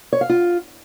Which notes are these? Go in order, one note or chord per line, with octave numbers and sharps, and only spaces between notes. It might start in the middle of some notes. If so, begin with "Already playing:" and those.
C#5
F5
F4